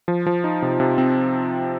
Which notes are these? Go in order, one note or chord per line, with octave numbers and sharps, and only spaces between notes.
F3
F3
D#4
C3
C3
C4